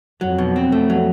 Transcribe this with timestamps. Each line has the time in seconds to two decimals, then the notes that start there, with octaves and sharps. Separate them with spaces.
0.21 F2 F#3
0.38 B2
0.56 C4
0.72 F2 A3
0.90 F#3